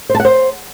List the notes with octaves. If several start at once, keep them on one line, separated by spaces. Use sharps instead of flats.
C5
A5
F#5
C5